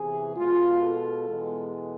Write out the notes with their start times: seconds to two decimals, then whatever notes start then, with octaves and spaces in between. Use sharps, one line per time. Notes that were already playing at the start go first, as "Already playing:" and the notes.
Already playing: E2 C3 E3 G#4
0.36 B2 G#3 F4
0.82 A4
1.29 E2 B2 G#3